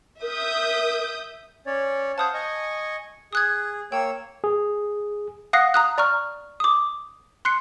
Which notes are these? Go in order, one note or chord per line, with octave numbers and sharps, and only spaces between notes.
A#4 E5 D#6 G6
C#4 C#5 D5
C5 F5 F#5 A5 D#6 G6
D#5 G#5 C#6
G#4 D#6 F#6 G#6
A#3 C#5 G5 E6
G#4
F5 F#5 D#6 F#6 A#6 C7
A#5 D#6 F#6
D5 A#5 C#6 F6
D6 D#6
C6 F#6 C7 C#7